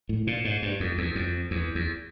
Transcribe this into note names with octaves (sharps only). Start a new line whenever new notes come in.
A2
A#2
G#2
G2
F2
E2
F2
E2
E2